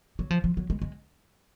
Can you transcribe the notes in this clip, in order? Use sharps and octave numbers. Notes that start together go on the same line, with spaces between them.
F#3
F3
F3
F#3
G#3
G#3